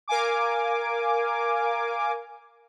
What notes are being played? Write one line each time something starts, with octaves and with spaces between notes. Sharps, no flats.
A#4 F5 G#5 D6